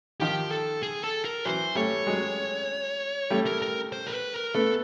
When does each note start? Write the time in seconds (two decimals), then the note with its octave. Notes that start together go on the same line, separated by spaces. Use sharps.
0.20 D#3 F3 G4
0.52 A4
0.83 G#4
1.04 A4
1.25 A#4
1.45 E3 F#3 C5
1.75 G3 A3 C#5
2.07 F#3 G#3
3.30 G3 A3
3.46 A#4
3.62 A#4
3.92 C5
4.07 A#4
4.14 B4
4.34 A#4
4.54 A3 B3 A4